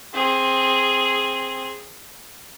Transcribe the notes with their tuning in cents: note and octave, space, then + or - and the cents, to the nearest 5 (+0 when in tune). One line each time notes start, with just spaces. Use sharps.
C4 +10 G#4 +0